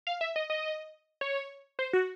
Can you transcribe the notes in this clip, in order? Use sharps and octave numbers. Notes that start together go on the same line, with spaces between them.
F5
E5
D#5
D#5
C#5
C5
F#4